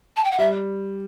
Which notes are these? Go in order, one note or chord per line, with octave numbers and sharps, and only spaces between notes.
A5
G5
F#5
G3 E5